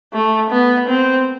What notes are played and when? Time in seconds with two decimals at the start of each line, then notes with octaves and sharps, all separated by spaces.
0.14 A3
0.51 B3
0.89 C4